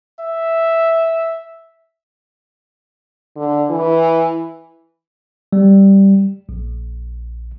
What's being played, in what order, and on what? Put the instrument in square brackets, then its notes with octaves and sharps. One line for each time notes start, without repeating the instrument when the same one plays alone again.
[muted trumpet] E5
[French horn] D3
E3
[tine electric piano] G3
A#1